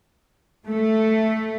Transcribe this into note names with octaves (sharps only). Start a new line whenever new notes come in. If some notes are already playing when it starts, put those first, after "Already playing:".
A3